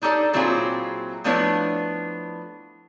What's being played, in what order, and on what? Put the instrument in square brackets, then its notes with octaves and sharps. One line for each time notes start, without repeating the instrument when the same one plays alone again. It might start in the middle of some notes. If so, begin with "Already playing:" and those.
[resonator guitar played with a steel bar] D4 D#4 G4 A4 D5
A#2 F#3 C4 E4 F4 G#4
F3 A3 B3 D4 E4 C#5